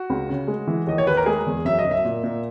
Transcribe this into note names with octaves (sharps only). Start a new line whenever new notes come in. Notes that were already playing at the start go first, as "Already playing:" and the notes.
Already playing: F#4
C#2
C#3
G#3
E3
D#2 D#5
C#5
D#2 B4
A#4
G#3 G#4
E2
F#2 E5
D#5
F#2
E5
A#2
A#2